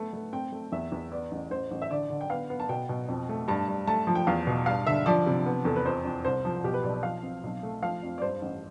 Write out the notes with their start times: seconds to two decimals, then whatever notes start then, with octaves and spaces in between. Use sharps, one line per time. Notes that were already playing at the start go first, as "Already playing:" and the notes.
Already playing: A3 B3
0.13 A3
0.33 C4 G5
0.52 A3
0.72 E2 E5
0.92 E2
1.11 B3 D5
1.31 A1
1.50 A1 C5
1.71 A1
1.82 E5
1.90 D3 D5
2.10 D3
2.21 G5
2.30 B3 F5
2.50 B3
2.60 A5
2.69 B2 G5
2.89 B2
3.08 F2
3.29 A3
3.48 G2 A5
3.68 G2
3.87 A3 A5
4.07 F3
4.15 G5
4.27 E2 F5
4.47 B2
4.66 G2 F5
4.86 D3 E5
5.06 F3 D5
5.26 C3
5.46 B3
5.65 E2 A4
5.76 B4
5.85 F2 C5
6.05 F2
6.25 C2 C5
6.45 F3
6.64 B2 G4
6.74 B4
6.83 B1 D5
6.93 D5
7.03 F3 F5
7.23 C4
7.43 B1
7.63 A3
7.82 F3 F5
8.03 F2
8.18 D5
8.22 G2 C5
8.42 A1